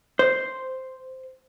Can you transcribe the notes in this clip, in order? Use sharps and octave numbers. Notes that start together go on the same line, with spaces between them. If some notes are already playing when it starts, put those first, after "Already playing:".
C5